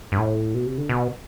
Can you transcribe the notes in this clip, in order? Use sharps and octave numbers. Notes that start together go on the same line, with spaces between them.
G2
A2
B2
C3
D3
B2